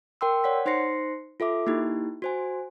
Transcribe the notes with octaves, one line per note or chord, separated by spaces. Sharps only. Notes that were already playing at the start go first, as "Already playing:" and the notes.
A#4 G5 C6 E6
C#5 D5 F#5 B6
D#4 C5 C6 A#6 C7 C#7
F4 A4 E5 D6
A#3 D#4 E4 G4
F#4 C5 G#5